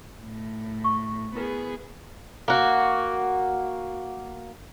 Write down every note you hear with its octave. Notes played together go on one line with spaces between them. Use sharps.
A2
C#6
B3 E4 G#4 A#4 B4
A#3 F#4